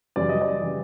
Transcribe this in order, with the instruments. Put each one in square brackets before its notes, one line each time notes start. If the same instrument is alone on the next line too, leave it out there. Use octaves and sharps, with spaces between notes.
[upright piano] F#2 C#3 E3 G3 D5
D#5
D5
C#3 E3 G3